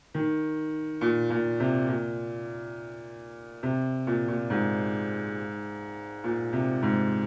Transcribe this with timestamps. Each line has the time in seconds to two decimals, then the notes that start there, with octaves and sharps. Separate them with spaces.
0.14 D#3
1.01 A#2
1.30 A#2
1.60 C3
1.88 A#2
3.63 C3
4.07 A#2
4.28 A#2
4.50 G#2
6.24 A#2
6.53 C3
6.82 G#2